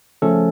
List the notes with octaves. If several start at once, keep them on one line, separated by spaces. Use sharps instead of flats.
C#3 F3 A3 C#4 A4